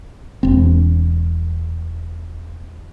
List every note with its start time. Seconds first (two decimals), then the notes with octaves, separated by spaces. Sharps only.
0.43 E1 C4